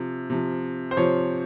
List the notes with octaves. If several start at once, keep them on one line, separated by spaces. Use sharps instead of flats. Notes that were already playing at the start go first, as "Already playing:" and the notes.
Already playing: C3 F3
C3 F3
C5
C3 F3 C#5